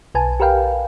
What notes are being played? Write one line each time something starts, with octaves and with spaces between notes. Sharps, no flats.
B1 B4 G#5 A5
G4 A#4 B4 F5 G5